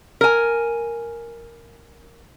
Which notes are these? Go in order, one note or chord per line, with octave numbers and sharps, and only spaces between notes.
A#4 G#5